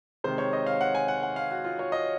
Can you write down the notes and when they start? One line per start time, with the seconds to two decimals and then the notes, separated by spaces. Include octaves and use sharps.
0.24 C3 D#3 G#3 C5
0.38 C#5
0.53 D#5
0.66 F5
0.81 F#5
0.95 G#5
1.08 F#5
1.23 F#5
1.36 F5
1.51 F#4
1.65 F4
1.79 C#5
1.92 D#5